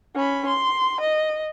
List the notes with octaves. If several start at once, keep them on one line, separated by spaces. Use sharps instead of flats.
C#4 B5
C6
D#5